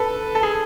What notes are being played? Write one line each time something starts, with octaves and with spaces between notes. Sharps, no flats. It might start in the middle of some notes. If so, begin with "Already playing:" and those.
Already playing: A4 B4
A4
G#4